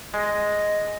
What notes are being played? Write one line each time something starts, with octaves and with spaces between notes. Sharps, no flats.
G#3 D#5